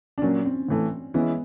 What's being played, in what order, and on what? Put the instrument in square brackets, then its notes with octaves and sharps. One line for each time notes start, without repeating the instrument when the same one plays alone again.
[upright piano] D4
[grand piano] A#2 F#3 A#3 [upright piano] C#4
[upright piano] C4
[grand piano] A2 E3 A3
[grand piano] E3 G#3 C#4 E4 [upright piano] B3